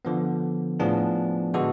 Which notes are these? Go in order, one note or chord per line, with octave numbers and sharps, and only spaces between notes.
D3 F3 B3
A2 F3 B3 D4 G#4
D3 G#3 B3 F#4 A4